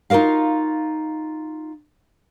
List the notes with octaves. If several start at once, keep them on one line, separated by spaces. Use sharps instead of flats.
D#4 F4 F#4 A#4 F5